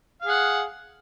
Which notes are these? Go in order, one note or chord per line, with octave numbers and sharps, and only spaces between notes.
G#4 F5 F#5